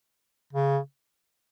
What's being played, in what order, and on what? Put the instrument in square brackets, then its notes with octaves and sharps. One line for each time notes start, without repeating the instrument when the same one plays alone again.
[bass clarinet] C#3